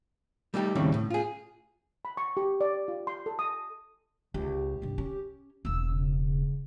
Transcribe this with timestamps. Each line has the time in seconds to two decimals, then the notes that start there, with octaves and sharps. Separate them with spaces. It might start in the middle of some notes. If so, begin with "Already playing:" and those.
0.54 G3 A3 D#4 G4
0.75 D#2 A2 C#3 G3 A3 C4
0.94 A2
1.10 F4 G#4
2.05 B5
2.17 C#6
2.37 G4
2.61 D5
2.88 F4
3.07 C6
3.26 A4
3.39 D#6
4.34 C#2 G4
4.82 C2 G2
4.98 C#4
5.65 E1 A#3 E6
5.89 C#3